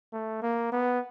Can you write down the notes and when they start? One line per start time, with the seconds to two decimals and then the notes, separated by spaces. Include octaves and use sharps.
0.13 A3
0.42 A#3
0.72 B3